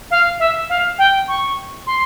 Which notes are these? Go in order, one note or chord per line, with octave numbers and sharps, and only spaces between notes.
F5
E5
F5
G5
C#6
C6